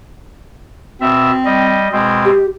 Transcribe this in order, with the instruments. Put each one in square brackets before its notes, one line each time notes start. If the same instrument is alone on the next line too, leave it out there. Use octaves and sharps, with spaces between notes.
[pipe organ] B2 E5 [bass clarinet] C4
[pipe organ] G3 D#5
[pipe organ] B2 C4 [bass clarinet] G#3
[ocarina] G4